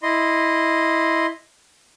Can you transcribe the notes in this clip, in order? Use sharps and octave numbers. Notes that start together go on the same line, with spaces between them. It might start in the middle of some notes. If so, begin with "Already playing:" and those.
E4 D#5 C6